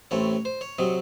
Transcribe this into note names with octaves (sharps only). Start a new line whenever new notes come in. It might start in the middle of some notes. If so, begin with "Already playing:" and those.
A1 A2 A3 C4 C#5
C5
C#5
C3 F#3 C4 D#5